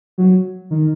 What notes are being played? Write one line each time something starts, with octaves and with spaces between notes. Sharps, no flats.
F#3
D#3